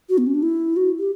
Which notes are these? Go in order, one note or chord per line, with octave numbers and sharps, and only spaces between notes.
F#4
B3
C#4
D4
E4
F#4
G4